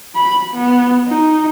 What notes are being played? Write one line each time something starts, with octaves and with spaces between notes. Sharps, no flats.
B5
B3
D#4